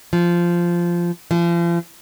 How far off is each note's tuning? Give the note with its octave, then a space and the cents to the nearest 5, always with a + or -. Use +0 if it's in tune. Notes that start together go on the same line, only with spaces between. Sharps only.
F3 -10
F3 -40